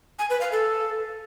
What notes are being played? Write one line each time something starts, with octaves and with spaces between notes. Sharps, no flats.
G#5
B4
F5
A4